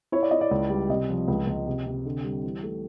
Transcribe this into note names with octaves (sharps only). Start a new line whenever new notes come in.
E4 C#5
D5
E4 D#5
D5
C#2
G3
C3 D#5
F3
C#2
C#2
C3
C3
D3
G3
E3
A3